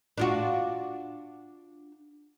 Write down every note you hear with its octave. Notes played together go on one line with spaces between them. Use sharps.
D4 F4 F#4